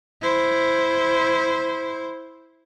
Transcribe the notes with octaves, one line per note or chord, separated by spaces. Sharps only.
E4 C5